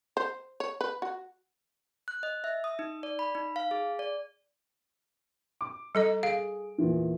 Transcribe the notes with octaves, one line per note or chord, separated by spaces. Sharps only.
C5
C#5
B4
F#4
F#6
D#5
E5
D#6
D#4
D5
B5
D#4
F5
G#4
D5
D6
G3 A4 D#5 A#5
G#4 F5 D7
E2 A#2 E3